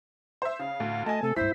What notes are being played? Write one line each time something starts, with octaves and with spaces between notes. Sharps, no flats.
C5 E5
C#3 F5
D2 A2
A3 D#5 G#5 A5
C3 A3 A4
D#1 G2 E4 C5 B6